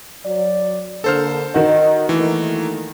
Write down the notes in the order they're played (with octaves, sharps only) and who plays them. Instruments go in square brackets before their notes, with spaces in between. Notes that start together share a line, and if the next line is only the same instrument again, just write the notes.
[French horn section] F#3 D5
[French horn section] D3 A#3 [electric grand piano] A4 C5 F6
[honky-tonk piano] D#3 F#4 [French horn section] D#5
[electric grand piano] E3 [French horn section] A3 A#3